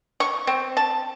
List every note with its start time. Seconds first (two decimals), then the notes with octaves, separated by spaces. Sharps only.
0.20 C#6
0.47 C4
0.77 A5